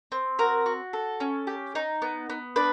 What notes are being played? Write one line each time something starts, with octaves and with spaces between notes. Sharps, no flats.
C4
F#4 A#4
F#4
A4
C#4
G4
D#4
B3
B3
D4 B4